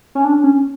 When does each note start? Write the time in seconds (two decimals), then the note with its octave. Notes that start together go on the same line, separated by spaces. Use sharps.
0.15 C#4
0.24 D4
0.44 C#4